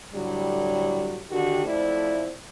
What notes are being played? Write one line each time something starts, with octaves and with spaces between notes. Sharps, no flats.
A2 D3 F#3 G3
D3 D#3 F#4 G4
F2 A3 E4 C5 D5